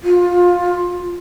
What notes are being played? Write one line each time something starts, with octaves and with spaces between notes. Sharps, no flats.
F4